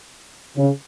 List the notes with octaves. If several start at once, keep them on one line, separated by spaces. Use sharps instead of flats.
C#3